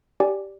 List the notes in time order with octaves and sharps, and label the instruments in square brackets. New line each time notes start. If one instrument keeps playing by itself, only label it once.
[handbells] G4 D5 G#5